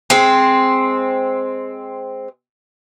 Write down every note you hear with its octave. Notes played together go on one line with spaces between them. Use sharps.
G#3 C4